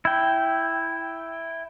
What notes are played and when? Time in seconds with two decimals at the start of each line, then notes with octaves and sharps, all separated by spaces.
0.05 E4 G5